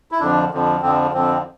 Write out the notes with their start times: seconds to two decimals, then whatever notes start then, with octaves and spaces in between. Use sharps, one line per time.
0.12 E4
0.20 F2 D3 F3 D4
0.52 F2 D3 F3
0.82 F2 D3 F3 C4
1.13 F2 D3 F3 C4